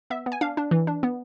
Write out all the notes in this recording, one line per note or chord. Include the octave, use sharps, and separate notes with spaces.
B3 E5
B3
G#5
D4 F5
D4
E3
D4
B3